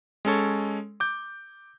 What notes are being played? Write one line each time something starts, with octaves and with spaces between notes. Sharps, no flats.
G#3 C#4 A4 C#5
D6 G6